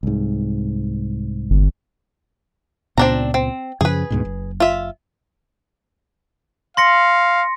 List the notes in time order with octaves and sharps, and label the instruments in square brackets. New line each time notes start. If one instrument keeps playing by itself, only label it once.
[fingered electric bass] C2 G#2
[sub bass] G1
[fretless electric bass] C#2 A#2 B3 [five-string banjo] C4 D4 A#5
[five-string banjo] C4
[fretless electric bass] F#2 C#3 F3 [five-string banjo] G#4 B4
[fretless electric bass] D2 G#2 B2
F#1
[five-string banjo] F4 E5
[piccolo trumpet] F5 [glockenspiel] C6 A#6 C#7